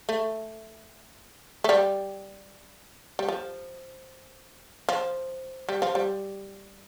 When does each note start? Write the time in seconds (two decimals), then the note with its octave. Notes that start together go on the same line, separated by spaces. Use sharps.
0.09 A3
1.64 A3
1.69 G3
3.19 G3
3.28 F3
4.89 F3
5.69 G3
5.82 F3
5.95 G3